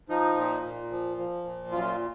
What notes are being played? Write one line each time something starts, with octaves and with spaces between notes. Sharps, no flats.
F3 D#4
A#2
A#2
F3
F3
A#2
F#2 F4